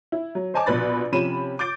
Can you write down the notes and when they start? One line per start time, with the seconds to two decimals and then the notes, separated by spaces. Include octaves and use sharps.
0.12 E4
0.35 F#3
0.54 C5 D#5 G#5 A5 D6
0.66 A#1 B2 B4 B5 A6
1.12 C3 F3 C#4 B5 D#7 E7
1.59 D6 G6 A6 D7